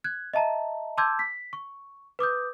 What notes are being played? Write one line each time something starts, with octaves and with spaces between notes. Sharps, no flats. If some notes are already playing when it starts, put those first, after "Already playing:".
F#6 G#6
D#5 E5 A5 A#5
A5 C6 D6 E6 G6 G#6
B6
C#6
B4 D6 D#6 G6